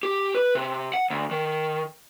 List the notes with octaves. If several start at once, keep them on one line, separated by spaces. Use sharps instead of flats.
G4
B4
C3
F#5
D2
D#3